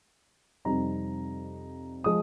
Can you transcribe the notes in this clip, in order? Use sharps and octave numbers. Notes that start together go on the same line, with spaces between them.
F2 C3 G3 C4 D#4 A#5
F3 G#3 D#6